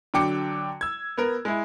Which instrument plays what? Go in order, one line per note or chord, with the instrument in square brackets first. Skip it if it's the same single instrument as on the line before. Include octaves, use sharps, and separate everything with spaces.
[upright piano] D3 F#3 G5 D6 C#7
E6 G#6
B3 A#4
G#3 E4